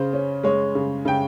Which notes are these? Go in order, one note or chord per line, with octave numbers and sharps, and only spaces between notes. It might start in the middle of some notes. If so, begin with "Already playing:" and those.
Already playing: C#3 C5
C#4
G#3 C#5
C#3
C#3 G5